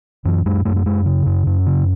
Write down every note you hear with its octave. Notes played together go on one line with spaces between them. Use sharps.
F#2 E3
F#2 G#3
F#2 A3
A3
F#2 G#3
C#3
F#2
F#2
C#3